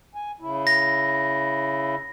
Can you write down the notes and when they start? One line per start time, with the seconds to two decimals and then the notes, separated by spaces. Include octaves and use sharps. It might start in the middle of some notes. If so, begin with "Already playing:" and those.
0.15 G#5
0.41 C#3 E4
0.67 A#6